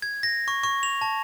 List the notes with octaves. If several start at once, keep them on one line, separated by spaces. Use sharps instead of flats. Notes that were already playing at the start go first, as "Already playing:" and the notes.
G#6
A#6
C#6
C#6
F7
A5